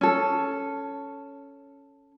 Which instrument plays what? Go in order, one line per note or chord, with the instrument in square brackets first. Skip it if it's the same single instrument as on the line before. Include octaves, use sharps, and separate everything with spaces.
[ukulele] C#4 A4